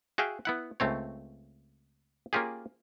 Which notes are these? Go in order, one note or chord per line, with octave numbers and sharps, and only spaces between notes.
F#4 G#4 E5 F5 G5
B3 E4 F#5
C#2 A3 C4 C#5
A#3 C#4 F4 G4 G#4